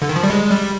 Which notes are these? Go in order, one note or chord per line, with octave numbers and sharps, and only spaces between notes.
D3
D#3
F3
G3
G#3
G3